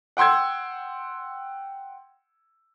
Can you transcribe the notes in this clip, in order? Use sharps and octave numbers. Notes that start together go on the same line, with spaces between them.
F#5 G5 C6 E6 G#6